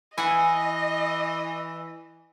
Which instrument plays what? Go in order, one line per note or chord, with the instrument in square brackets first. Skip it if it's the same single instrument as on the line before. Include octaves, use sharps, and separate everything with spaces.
[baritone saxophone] E3 [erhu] D#5 [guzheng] F#5 G#5